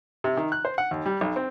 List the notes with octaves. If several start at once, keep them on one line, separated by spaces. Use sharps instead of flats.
C3
D#3
F#6
C5
F#5
D#2
G3
B1
C4